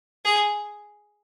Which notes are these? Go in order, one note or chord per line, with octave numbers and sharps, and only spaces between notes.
G#4